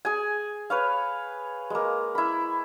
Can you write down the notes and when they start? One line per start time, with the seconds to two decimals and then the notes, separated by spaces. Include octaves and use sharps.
0.05 G#4 G#5
0.70 B4 C#5 F5
1.70 G#3 A#3
2.15 E4 B5